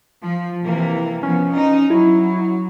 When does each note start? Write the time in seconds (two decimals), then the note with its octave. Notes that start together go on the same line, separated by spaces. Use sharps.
0.21 F3
0.64 C3 E3 A#3
1.23 F3 B3 C#4
1.53 D#4
1.90 F#3 E4